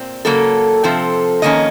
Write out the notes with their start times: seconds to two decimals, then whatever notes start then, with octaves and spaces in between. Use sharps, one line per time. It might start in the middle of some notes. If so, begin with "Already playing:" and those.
Already playing: A#2 C4
0.25 C#3 F#3 A#3 A4
0.84 C3 F3 C4 A4
1.42 F2 D#3 A#3 C#4 D#5